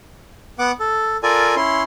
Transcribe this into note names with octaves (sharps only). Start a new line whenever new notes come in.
B3 F#5 D6
A4
F4 A4 A#4 D5 G#5
C#4 E4 C6